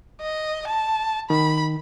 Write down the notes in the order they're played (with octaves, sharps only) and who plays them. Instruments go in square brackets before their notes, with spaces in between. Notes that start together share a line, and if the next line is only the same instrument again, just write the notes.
[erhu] D#5
A5
[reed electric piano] D#3 [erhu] B5